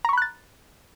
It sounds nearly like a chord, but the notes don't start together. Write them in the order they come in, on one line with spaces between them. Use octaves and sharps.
A#5 C#6 B5 F#6 A6